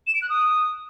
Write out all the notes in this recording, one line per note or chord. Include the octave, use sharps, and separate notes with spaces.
E7
D7
F#6
D#6